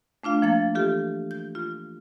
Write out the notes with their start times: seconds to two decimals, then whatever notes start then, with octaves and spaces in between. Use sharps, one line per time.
0.23 A3 D4 F4 F5
0.42 F3 A#3 A6
0.75 E3 F4 G4 A4
1.31 G6
1.55 F4